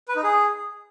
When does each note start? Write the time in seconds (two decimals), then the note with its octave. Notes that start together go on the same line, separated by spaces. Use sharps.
0.08 B4
0.16 D#4
0.23 G#4